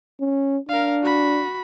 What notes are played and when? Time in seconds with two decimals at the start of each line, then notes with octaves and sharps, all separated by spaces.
0.20 C#4
0.69 D4 A#4 F5
1.03 F#4 B5